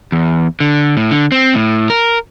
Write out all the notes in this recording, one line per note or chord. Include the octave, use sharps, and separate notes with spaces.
E2
D3
A2
D3
C4
A2
A#4